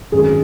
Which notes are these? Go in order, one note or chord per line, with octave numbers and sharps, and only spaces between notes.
G#1 F#2 D#3 G#4